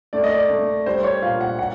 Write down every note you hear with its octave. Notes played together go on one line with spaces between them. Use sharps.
A3 D5
D#5
D5
A3
G3 C5
C#5
A#2 F5
F#5
A#2 F#5